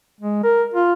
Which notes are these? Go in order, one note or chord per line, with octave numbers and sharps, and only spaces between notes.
G#3
A#4
F4